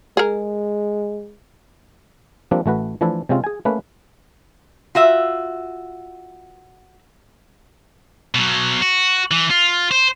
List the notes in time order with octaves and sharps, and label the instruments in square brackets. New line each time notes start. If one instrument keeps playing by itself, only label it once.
[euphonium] G#3 [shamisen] G#4 A#4
[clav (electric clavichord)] F3 G3 A#3 C4 D4
A1 A3 F#4 B4
E3 F3 A3 D4 E4 A4
C3 G#3 C4 C#4 F4
G#4 G#5
A3 A#3 C#4 B4
[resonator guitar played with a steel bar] F4 F#4 E5
[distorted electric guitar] B2 F#3
F#4
E3
F4
C5